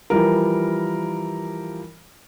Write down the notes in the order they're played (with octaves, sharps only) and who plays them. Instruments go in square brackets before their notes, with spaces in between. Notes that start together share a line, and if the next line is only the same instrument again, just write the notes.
[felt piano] E3 F3 G3 A#4